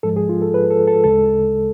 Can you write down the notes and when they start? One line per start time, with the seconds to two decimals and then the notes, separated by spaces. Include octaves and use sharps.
0.03 G#2 F3 G#3 A4
0.16 G#4
0.29 F4
0.42 A4
0.54 B4
0.70 A4
0.87 A4
1.04 D2 C#3 G#3 A4